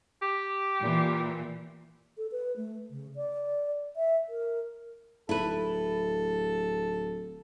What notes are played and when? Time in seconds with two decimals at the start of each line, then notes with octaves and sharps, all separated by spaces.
0.22 G4
0.81 A#2 E3
2.18 A4
2.32 B4
2.57 A3
2.91 C#3
3.16 D5
3.96 E5
4.29 A#4
5.29 D1 E4 A4 B4